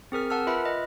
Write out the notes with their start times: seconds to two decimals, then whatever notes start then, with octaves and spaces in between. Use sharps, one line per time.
0.12 C4 G#4 A#4 F6
0.30 A#4 F#5 A5 E6 F6
0.47 F4 B4 E5 B5 F6
0.65 D#5